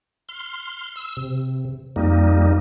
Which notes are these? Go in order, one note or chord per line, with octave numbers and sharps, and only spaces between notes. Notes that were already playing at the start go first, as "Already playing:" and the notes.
C6 F6
E6
C3
F2 G3 A#3 D#4